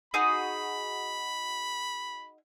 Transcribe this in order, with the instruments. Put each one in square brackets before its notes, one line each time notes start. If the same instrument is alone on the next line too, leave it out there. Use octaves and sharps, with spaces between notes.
[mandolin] D#4 F#4 G#4 [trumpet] B5